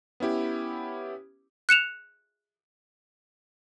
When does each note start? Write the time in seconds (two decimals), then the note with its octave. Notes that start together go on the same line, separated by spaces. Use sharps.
0.20 B3 C#4 E4 G4
1.69 F#6 C#7 E7 F7